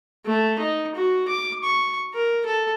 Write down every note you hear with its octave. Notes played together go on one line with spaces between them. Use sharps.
A3
D#4
F#4
D6
C#6
A#4
A4